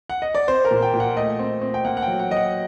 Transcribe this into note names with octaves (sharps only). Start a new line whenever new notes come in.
F#5
D#5
D5
C4 C5
A#4
A#2
G5
A#2
F#5
A3 D#5
C4
C4
G5
A#3 F#5
F#5
G5
F#3
F#5
F#3 D#5
F#5